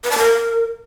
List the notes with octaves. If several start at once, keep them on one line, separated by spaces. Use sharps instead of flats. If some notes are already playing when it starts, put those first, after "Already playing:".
B4
A5
A#4